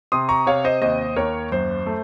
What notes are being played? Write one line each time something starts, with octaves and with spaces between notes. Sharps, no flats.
C3 C6 D#6
A#5 C#6
C3 C#5 F5
C5 D#5
D#2 C5 D#5
D#2 A#4 C#5
F#2 C5
A3